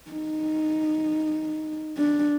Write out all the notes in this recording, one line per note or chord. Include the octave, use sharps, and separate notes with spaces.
D#4
D4